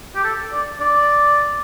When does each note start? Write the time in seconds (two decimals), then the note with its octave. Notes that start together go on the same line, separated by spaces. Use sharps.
0.15 G4
0.24 A4
0.52 D5
0.80 D5